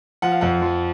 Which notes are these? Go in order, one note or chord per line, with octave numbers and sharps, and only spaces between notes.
F3 F#5
F5
F2 F#5
F3